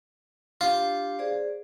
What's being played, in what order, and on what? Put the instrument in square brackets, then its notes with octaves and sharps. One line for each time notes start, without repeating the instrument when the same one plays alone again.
[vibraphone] D4 G4 [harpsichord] F4
[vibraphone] G#4 C5 D5